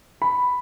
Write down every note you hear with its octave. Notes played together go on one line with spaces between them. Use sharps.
B5